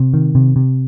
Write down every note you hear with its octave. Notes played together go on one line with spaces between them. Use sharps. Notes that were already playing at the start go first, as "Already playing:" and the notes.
Already playing: C3
D#3
C3
C3